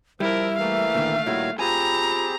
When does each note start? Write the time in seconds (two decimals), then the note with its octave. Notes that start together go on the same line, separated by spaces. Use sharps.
0.20 F3 G3 E4 A#4 E5
0.58 E3 A3 A#3 F5
0.95 A#2 D3 D#3
1.26 A#2 D#3 G3 E4 F#4 C#5 E5
1.59 C4 F4 G4 G#4 G#5 A#5 B5